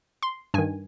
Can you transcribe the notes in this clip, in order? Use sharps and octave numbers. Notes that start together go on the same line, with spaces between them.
C6
G2 D#3 G#5